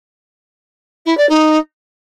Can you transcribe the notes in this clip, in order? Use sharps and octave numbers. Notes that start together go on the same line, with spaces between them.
E4
D5
D#4